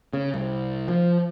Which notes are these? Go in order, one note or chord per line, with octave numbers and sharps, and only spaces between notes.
C#3
C2
F3